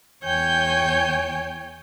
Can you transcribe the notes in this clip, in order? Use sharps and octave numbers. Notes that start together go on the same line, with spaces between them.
E2 C#5 G5 G#5 G6